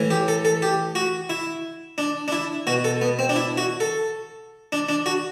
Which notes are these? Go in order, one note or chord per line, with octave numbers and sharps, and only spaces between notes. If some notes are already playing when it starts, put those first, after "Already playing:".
Already playing: A2 E3
G4
A4
A4
G4
F#4
E4
D4
D4
E4
B2 F#4
A4
B3
C4
D4
E4
F#4
A4
D4
D4
F#4